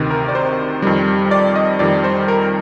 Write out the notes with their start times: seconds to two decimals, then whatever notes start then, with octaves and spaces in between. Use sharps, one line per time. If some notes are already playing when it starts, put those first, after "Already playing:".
Already playing: D2 C3 D#3
0.10 A#4
0.29 D5
0.35 C5
0.82 F2 D#3 G3
1.31 D5
1.56 D#5
1.79 F2 D#3 G3 D5
2.04 C5
2.28 A#4